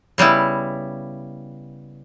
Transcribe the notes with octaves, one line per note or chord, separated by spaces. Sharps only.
C#3 G3 B3 E4